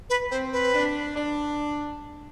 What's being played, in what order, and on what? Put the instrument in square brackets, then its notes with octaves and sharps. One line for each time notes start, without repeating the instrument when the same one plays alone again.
[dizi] B4
[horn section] C4 [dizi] C5
[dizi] B4
[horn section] D4
D4